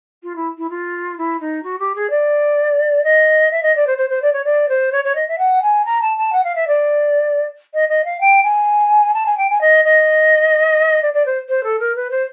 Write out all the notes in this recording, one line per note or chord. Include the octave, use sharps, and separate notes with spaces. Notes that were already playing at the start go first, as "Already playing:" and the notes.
F4
E4
E4
F4
E4
D#4
F#4
G4
G#4
D5
D#5
E5
D#5
D5
C5
C5
C5
D5
C#5
D5
C5
C#5
C#5
D#5
E5
F#5
G#5
A#5
A5
A5
F#5
F5
E5
D5
D#5
D#5
F5
G5
G#5
A5
G#5
G5
G#5
D#5
D#5
D5
D5
C5
C5
A4
A#4
B4
C5